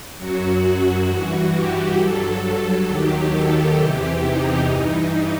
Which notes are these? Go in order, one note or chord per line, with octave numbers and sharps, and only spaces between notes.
F#2 F#3 F#4
F#4
G2 E3 F#4
G4
G2 F#3 A4
D#2 D#3 F#3 G4
A4
E2 C3 E3 G4
D#4
G2 E3